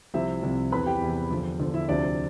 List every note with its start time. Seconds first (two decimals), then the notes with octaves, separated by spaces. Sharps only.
0.14 C2 C3 F3 E4 E5
0.43 C2 C3 F3
0.72 E2 C3 E3 B4 B5
0.86 G4 G5
1.01 E2 C3 E3
1.31 E2 D3 F3
1.60 E2 D3 F3
1.74 E4 E5
1.88 D2 C3 F3 D4 D5